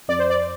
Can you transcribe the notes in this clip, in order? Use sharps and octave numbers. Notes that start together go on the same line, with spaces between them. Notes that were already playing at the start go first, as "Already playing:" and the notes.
F2 D5
C5
D5